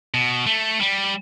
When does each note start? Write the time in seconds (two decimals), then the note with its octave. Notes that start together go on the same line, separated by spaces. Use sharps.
0.14 B2
0.46 A3
0.81 G3